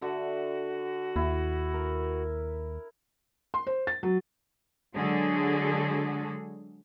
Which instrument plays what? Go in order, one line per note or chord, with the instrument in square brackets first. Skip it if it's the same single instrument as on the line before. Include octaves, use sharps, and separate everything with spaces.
[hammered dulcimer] D3 E5 [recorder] F#4
[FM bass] D#2 [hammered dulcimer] E4
[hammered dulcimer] A#4
[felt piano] C6
C5
A6
F#3
[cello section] D3 F#3 G#3 F#4 G#4 A4